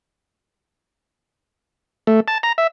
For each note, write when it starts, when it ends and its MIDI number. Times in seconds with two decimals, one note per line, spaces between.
2.07 2.20 57
2.28 2.38 81
2.43 2.52 82
2.58 2.67 76